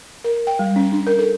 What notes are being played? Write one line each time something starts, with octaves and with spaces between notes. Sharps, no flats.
A#4
G5
G3
C#4
D4
A#4
A4